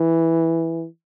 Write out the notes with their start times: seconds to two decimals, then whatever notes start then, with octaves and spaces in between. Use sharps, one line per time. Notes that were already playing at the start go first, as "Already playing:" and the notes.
Already playing: E3